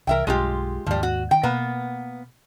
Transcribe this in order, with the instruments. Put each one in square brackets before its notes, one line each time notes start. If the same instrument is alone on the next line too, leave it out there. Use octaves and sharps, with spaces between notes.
[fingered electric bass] C2 E3 [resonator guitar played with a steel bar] A#4 E5 G5
[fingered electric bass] B1 G2 [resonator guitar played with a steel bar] G#3 F4 G4
[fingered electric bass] D#2 G#2 D#3 [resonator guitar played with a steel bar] F3 G3
[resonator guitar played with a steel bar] F#4
[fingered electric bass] D#3 [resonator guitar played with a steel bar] G5
[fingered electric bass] B2 [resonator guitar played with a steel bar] A#3 B3 B4